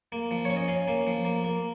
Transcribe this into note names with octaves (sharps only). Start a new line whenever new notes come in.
A#3
F3
C#4 C#5
D#5
C#4 F5
A#3 F5
F3
A#3
A#3